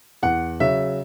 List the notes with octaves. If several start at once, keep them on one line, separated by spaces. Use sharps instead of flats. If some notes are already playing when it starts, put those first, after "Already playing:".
E2 F#5
C#3 F#3 E5